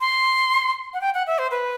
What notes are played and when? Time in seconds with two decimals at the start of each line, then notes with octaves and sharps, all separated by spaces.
0.01 C6
0.94 F#5
1.01 G5
1.14 F#5
1.27 E5
1.38 C5
1.51 B4